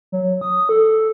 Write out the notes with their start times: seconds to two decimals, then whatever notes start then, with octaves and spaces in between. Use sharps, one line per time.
0.12 F#3
0.41 D#6
0.69 A4